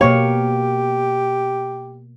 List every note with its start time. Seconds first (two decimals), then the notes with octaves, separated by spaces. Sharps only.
0.01 B2 A#3 G4 C#5 F5